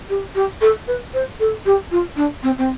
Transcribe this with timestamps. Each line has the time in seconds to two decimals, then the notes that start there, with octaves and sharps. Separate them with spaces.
0.09 G4
0.35 G4
0.61 A4
0.87 B4
1.14 C5
1.40 A4
1.65 G4
1.91 F4
2.16 D4
2.43 C4
2.58 C4